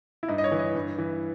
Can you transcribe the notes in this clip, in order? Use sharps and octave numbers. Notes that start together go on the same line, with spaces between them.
E4
G2 D#4
D#5
C#5
E3
D#5
G2
E3